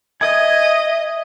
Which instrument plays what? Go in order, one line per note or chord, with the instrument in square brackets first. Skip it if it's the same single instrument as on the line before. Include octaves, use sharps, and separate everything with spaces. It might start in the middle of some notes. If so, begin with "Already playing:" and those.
[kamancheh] D#5 [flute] E5 [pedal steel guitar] G#5 D#6